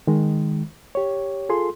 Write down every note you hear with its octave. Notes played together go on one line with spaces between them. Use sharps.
D#3 G#3
G4 C#5
F4 G#4 A4 C6